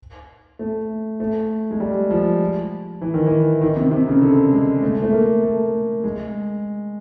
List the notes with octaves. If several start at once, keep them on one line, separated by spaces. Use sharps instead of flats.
A3
A3
G#3
G3
F3
E3
D#3
E3
D#3
C3
C3
C#3
D3
G#3
A3
A3
A#3
A3
G#3